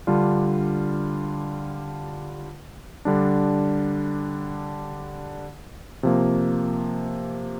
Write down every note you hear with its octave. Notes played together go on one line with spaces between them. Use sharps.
D3 G3 D4 F4
D3 G3 D4
C3 F3 A#3